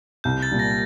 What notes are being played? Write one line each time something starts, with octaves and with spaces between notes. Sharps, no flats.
C2 G6
A6
A#2 G3
A#6